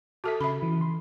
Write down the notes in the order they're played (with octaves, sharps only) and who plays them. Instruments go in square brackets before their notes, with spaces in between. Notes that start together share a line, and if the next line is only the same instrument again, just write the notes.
[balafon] F#4 A4 E5 [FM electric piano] A5 D#6 B6
[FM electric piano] C#3 [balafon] E5 B5
[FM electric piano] E3
C6